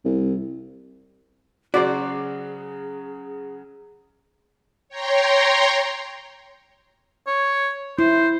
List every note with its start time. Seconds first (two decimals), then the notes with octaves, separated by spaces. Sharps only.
0.05 C2
1.74 C#3 F#3 F#4 G#4 C5 D5
4.89 C#5 G5 A#5 C6
7.27 C#5
7.99 E4 C5